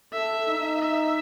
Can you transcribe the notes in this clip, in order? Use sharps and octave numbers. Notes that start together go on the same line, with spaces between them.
A4 E5
D#4
E5